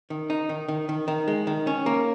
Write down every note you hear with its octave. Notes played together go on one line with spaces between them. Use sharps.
D#3
D#4
D#3
D#3
D#3
D#3
G#3
D#3
C#4
A#3